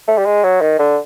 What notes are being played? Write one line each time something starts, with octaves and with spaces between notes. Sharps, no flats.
A3
G3
G#3
F#3
D#3
D3